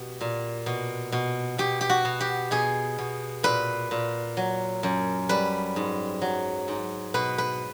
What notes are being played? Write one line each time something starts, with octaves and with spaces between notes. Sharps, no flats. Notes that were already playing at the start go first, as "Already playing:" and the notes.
Already playing: B2 G4
A#2
B2
B2
B2 G4
G4
F#4
B2
G4
B2 G#4
B2
A#2 B4
A#2
F#3
F#2
G3 B4
G#2
F#3
G#2
B2 B4
B4